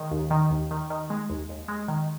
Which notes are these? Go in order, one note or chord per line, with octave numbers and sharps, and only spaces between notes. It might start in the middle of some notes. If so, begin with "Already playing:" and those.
Already playing: D#3 G#3
D#2
D#3
D#2
D#3
D#3
G#3
D#2
D#2
G#3
D#3